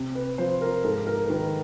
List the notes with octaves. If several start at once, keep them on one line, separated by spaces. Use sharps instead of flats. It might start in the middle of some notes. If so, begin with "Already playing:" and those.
Already playing: C3
B4
F3 C5
A#4
G#2 A4
A#4
A#4
D#3 B4